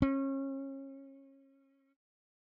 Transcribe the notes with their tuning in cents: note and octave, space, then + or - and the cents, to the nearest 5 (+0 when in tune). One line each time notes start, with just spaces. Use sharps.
C#4 -30